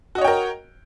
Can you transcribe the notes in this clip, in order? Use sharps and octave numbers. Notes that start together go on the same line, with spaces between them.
F#4 A#4 C#5 D#5 G5